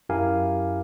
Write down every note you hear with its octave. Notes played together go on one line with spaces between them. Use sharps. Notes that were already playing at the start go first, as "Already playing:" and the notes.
F#2 E4 G4 A#4 F5 G#5